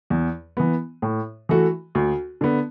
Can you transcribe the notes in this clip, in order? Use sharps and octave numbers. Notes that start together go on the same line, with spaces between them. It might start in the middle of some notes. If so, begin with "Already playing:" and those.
E2
E3 B3
A2
E3 A3 F#4
D2
D3 B3